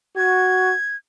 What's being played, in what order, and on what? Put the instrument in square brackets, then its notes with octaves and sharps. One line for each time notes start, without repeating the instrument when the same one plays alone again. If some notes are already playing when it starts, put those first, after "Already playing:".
[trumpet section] F#4 [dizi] G#6